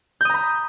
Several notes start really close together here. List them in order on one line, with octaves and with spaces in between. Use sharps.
G6 D#6 A#5 B5